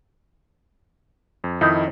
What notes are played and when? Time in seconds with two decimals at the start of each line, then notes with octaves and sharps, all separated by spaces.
1.44 F2
1.61 F2 D#3 D#4 E4